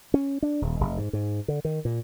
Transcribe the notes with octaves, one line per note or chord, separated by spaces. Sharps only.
C#4
D4
D#1
F1
G#2
G#2
D3
D#3
A#2